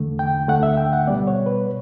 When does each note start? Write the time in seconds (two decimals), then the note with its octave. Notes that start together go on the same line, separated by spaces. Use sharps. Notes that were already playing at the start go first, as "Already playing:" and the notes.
Already playing: E2 D3 A3
0.19 G5
0.48 D2 D3 A3 F#5
0.63 E5
0.77 G5
0.93 F#5
1.07 B3 D5
1.10 B2 G3
1.27 C#5
1.46 B4
1.66 B2